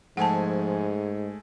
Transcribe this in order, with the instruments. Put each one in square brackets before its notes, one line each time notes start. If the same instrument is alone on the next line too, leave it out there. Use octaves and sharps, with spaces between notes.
[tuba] G#2 [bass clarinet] F3 [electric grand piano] G#3 A3 G#5 [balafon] F#5 A5